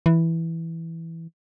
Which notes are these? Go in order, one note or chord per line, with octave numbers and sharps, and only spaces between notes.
E3